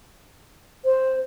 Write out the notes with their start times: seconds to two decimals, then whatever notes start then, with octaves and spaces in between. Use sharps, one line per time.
0.85 C5